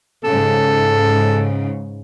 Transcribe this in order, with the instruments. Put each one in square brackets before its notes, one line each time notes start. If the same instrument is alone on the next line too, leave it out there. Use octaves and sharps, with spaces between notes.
[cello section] G#2 C#3 [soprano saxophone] A4